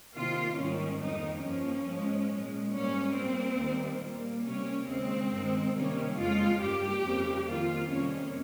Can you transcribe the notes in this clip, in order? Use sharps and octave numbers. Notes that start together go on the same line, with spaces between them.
C3 D#3 A#3 F4
G#2 D#3 G3 A#3 C#4
F2 D#3 G3 A#3 D#4
G2 F3 A#3 C#4
G#2 F3 G#3
A#2 G#3
G#2 G3 A#3 C#4
A#2 G3 A#3 C4
D#2 D#3 G3 A#3
A#2 G3 A#3
C3 G3 A#3 C#4
D#2 C#3 G#3 C4
G2 D#3 G#3
C3 D#3 G3 A#3 C#4
F2 C#3 G#3 F4
G2 G3 A#3 G4
F2 C#3 G3 A#3
F2 D#3 A#3 F4
F2 C3 D#3 G3 A#3 C#4